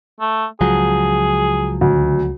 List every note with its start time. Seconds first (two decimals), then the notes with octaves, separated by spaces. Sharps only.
0.21 A3
0.61 C#2 F3 F#3 G#4
1.81 D2